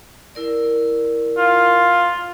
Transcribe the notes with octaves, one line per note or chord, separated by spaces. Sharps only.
E4 A#4 D5
F4